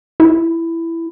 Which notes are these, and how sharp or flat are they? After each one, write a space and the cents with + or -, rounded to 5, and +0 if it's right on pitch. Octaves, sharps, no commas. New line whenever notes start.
E4 +10